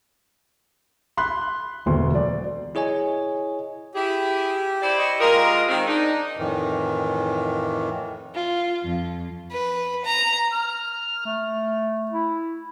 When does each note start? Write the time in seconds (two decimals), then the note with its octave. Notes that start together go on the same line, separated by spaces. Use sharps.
1.17 B5 C6 F#6
1.86 E1 D2 B2 C6
2.14 F#3 D5
2.75 E4 G#4 C#5 D#5 G#5
3.94 E4 G4 G#4
4.82 E4 C5 D5
4.98 D#5 C#6
5.20 G#3 F4 G4 A#4 D#5 D#6
5.68 D#3 G#3 C4
5.87 D4 D#4
6.37 F2 A2 D#3 E3
8.33 F4
8.85 F2
9.51 B4
10.05 A#5
10.52 F6
11.25 A3
12.11 E4